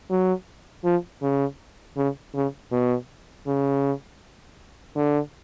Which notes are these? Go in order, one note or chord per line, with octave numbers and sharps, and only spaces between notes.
F#3
F3
C#3
C#3
C#3
B2
C#3
D3